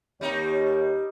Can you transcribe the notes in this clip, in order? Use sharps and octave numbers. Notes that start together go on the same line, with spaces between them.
D#2 G3 D#4 C#5